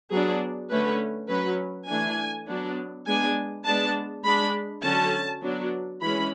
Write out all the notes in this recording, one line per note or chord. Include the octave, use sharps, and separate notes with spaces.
F#3 B3 D4 G#4
D3 A3 C#4 B4
F#3 C#4 B4
E3 A3 D4 G#5
F#3 B3 D4
G#3 B3 D4 G#5
G#3 B3 D4 A5
G#3 D4 B5
D3 F#3 C#4 A5
F#3 B3 D4
E3 G#3 C#4 B5